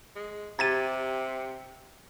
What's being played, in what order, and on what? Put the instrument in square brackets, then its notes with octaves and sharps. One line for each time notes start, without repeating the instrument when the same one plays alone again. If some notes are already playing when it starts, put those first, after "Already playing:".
[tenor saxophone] G#3
[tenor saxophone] C3 [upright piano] G4 G5 A#5 [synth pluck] G#6 A6 D#7